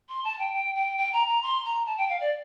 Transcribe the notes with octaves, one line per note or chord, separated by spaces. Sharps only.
C6
A5
G5
G5
G5
G5
A#5
A#5
C6
A#5
A5
G5
F5
D5